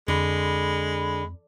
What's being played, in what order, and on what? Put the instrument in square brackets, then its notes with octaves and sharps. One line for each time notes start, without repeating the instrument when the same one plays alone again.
[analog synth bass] F2 [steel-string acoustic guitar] D3 [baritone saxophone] G#3 [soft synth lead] B5